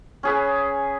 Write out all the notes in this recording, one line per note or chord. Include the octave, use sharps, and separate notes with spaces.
C#4 G#4 B4